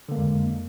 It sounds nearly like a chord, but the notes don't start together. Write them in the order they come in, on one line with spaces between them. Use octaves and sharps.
D3 A#3 G#3 F2